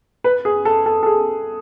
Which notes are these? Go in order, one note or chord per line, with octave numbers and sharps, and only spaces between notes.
B4
G#4
A4
A4
A4
G#4